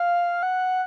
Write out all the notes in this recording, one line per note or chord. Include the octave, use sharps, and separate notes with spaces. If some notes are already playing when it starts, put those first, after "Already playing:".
Already playing: F5
F#5